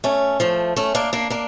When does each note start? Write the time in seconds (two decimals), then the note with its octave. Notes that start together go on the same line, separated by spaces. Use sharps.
0.04 A3 C#4
0.40 F3 A3
0.77 A3 C#4
0.95 A#3 D4
1.13 A#3 D4
1.30 A#3 D4